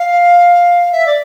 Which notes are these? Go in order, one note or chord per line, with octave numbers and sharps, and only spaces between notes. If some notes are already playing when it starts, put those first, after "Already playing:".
Already playing: F5
E5
D5